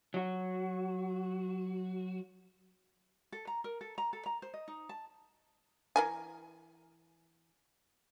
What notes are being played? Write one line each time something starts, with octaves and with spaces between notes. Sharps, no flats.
F#3 F#4
A4
A#5
A#4
A4
A#5
A4
A#5
C5
D#5
D#4
A5
E3 A#4 G#5